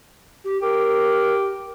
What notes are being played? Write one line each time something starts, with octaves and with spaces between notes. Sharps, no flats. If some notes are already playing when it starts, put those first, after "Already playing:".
G4
G4 A#4